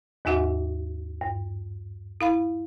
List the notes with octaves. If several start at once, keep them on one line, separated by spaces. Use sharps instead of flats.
D#2 G#2 D#4 F#4 E5 F#5
G2
E4 F5 B5